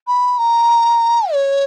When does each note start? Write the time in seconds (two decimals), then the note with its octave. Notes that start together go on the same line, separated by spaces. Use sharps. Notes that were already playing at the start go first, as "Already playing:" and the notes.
0.07 B5
0.38 A#5
1.32 C#5